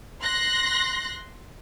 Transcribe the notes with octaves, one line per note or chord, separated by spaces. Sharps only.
C6 F#6 A#6